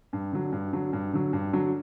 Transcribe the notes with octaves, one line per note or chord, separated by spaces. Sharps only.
G2
D3 F#3
G2
D3 F#3
G2
D3 F#3
G2
D3 F#3